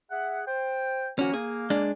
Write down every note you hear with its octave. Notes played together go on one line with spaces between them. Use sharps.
G#4 E5 F#5
C5 G5
D#3 F3 A#3 C#4 F#4
A#3 G#4
G#3 D4